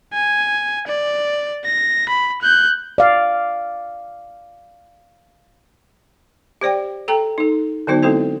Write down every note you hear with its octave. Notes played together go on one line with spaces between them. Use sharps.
G#5
D5
A#6
B5
F#6 G6
D5 F5
G4 C5 D5 G5
A4 G5 A#5
D#4 A4
D3 F#3 B3 D#4 F#4 C5
G#3 C4 E4 A4 C5